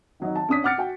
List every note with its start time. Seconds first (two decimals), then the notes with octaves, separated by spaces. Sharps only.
0.20 D#3 F#3 D#4
0.36 A5
0.49 C#4 D4 D#6 B6
0.64 F#5 D6 F6 A6 C#7
0.78 F#4 G5